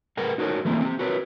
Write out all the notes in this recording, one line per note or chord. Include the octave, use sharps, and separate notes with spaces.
G#4 A#4 B4 F#5
D#4 F#4 A4 A#4 C#5
E3 A3 A#3 C4 E4
C4 G4
F#4 A#4 B4 C#5